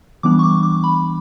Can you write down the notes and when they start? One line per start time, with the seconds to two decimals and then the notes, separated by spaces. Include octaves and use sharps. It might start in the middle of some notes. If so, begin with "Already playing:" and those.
0.23 E3 G3 B3 D4 D6
0.39 C#6
0.43 D6
0.63 D6
0.84 B5